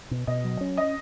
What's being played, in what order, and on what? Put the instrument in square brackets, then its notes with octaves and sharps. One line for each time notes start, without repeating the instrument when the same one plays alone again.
[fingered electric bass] B2
[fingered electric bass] B2 [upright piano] D#5
[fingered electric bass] F#3
C#4
[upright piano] D#5